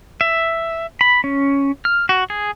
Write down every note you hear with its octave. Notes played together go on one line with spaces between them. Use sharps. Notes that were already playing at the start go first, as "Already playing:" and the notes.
E5
B5
C#4
F6
F#4
G#4